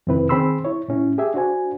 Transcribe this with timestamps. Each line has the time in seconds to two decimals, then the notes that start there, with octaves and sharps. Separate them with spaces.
0.07 F2 C3 D#3 C4 E4 B4
0.29 D#3 C4 G#4 B5 C6 E6
0.65 E4 C#5
0.88 A2 C#4 E4
1.18 G4 G#4 E5 G#5
1.34 D4 F#4 C5 G#5